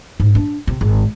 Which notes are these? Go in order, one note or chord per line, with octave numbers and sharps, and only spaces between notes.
G#2
D4
C3
G#1